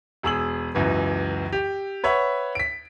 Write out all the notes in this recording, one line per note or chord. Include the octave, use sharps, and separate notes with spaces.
E1 G#4 E6 F#7
C#2 F#2 E3
G4
B4 C#5 E5 F#5
B6 D7